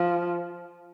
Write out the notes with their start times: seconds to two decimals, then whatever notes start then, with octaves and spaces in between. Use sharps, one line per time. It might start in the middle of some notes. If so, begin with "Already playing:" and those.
Already playing: F3